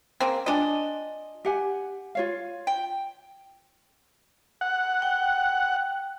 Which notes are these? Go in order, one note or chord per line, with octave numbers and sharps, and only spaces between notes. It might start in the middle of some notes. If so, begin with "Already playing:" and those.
C#3 A#3 C4
D4 F4 D5 D#5 G#5
G4 F#5 G#5
F4 C#5 F5
G5
F#5
G5